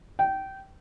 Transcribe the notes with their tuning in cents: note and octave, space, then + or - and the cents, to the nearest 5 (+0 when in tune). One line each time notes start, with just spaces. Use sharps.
G5 -20